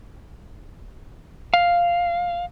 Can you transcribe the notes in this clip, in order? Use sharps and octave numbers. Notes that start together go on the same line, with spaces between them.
F5